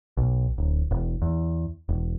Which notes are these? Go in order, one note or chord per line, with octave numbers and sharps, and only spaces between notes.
B1
D1
E1
E2
E1